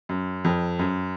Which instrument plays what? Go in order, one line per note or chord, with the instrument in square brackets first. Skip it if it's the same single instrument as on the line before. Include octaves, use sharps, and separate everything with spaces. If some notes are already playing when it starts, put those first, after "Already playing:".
[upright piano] F#2
F2
F#2